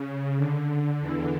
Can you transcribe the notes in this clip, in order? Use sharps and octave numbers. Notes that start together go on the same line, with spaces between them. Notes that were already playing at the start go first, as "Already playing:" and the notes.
Already playing: C#3
D3
E2 E3